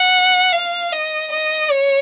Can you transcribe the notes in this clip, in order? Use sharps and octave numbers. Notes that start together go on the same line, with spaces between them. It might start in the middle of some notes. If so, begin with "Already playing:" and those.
Already playing: F#5
F5
D#5
D#5
C#5